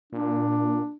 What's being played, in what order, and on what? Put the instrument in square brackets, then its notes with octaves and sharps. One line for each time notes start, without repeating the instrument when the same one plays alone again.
[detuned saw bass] A#2 [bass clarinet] D4